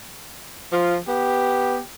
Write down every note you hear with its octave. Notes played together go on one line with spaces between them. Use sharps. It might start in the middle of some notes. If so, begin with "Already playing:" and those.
F3 F4
B3 G4